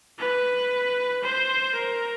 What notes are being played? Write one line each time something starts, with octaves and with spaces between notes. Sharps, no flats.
B4
C5
A#4